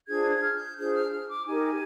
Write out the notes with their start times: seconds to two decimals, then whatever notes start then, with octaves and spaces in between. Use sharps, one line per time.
0.08 D4 F4 G#4 C5 G#6
0.31 G#6
0.43 F6
0.54 G6
0.77 D4 F4 G#4 C5 G6
0.95 F6
1.12 F6
1.29 D6
1.46 D#4 G4 A#4 G#5